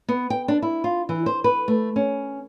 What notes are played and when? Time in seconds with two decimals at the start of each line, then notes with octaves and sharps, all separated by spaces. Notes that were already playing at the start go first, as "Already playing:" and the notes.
0.09 B3
0.30 G5
0.48 D4
0.62 E4
0.84 F4
1.09 E3
1.26 C5
1.44 B4
1.68 A3
1.96 C#4